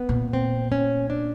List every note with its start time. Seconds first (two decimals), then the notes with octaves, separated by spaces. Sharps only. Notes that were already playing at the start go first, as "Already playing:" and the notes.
Already playing: B3
0.09 A#2
0.33 C4
0.72 C#4
1.10 D4